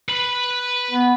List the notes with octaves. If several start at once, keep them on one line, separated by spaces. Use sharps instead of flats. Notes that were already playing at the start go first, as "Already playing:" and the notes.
B4 B5
B3